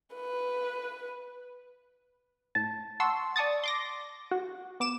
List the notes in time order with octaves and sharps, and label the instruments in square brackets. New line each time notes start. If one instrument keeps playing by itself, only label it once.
[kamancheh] B4
[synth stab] A2 A5
F#5 A5 C6 C#6 E6
D5 A5 C#6 D#6 A6
C6 D6 A#6
F#4
B3 D6 E7